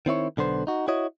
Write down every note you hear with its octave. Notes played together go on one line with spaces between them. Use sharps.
D#3 C4 E4 C#5
B1 D3 B3 C5
D#4 F#4
E4 F#4 C#5 D#5